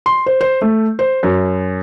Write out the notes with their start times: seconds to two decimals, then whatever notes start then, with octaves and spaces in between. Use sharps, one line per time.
0.06 C6
0.26 C5
0.41 C5
0.62 A3
0.99 C5
1.23 F#2